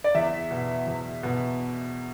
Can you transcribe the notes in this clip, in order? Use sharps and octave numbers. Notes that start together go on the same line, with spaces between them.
D5
E2 E5
B2
E2
B2